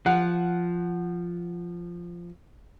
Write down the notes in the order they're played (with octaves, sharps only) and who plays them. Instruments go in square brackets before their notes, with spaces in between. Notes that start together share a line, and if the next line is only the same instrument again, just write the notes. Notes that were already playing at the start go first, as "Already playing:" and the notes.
[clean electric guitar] F3 [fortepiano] F#5